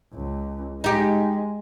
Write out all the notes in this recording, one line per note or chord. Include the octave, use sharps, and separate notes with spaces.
C#2
G#3 D#4 G4